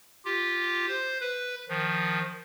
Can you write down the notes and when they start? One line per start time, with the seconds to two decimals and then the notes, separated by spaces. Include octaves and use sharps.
0.25 F4 G4
0.87 C5
1.20 B4
1.69 D#3 F3